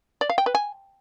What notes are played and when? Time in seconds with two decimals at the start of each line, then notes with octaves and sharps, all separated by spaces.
0.21 D5
0.29 F5
0.38 G5
0.46 B4
0.55 G#5